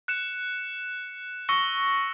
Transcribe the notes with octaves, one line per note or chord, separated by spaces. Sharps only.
F#6 C#7 E7
C#6 E6 A#6 C#7 G7